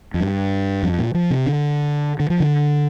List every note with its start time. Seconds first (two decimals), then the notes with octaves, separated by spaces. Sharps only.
0.14 F2
0.20 G2
0.83 F2
0.99 A#2
1.14 F3
1.30 C3
1.46 D3
2.20 D3
2.30 F3
2.40 D3